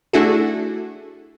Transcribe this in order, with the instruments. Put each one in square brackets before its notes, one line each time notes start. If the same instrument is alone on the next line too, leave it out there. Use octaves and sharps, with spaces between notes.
[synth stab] A3 D4 E4 F#4 G#4 A4